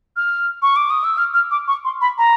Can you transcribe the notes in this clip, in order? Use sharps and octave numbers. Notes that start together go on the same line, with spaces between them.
F6
C#6
D6
D#6
E6
F6
F6
D6
C#6
C6
B5
A#5